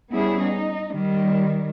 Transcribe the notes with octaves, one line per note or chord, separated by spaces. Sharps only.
G3 B3 C#4 E4 G#4
D#4
D#3 G3